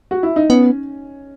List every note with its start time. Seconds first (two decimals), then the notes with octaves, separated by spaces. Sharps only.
0.11 F#4
0.23 E4
0.36 D#4
0.49 B3 C#4